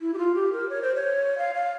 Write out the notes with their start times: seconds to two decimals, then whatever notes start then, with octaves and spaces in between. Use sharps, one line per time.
0.01 E4
0.14 G4
0.18 F4
0.35 G4
0.53 A#4
0.69 C#5
0.82 C5
0.96 C#5
1.38 F5
1.55 F5